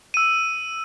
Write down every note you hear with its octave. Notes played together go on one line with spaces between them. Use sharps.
E6 D#7